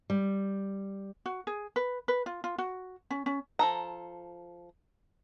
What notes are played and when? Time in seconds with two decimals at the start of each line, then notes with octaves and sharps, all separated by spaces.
0.10 G3
1.26 F#4
1.47 G#4
1.76 B4
2.08 B4
2.26 F4
2.44 F4
2.58 F#4
3.11 C#4
3.26 C#4
3.59 F3 A4 A#5